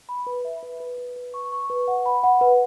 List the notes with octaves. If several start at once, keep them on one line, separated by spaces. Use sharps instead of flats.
B5
B4
E5
B4
B4
B4
B4
C#6
C#6
B4
F#5
B5
F#5
B4